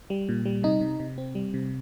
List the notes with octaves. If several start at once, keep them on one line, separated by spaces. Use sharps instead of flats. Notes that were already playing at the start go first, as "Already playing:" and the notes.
G3
A#2
G3
C3 D#4
C3
C3
C4
G3
C3